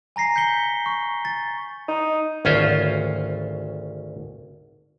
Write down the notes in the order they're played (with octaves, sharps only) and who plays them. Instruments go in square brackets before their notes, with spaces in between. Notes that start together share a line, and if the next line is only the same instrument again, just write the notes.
[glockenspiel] G#5 A#5 A#6 C7
G6 B6 C#7 G7
C#6
A6
[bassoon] D#4
[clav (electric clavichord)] G#1 D2 C#4 F4 C5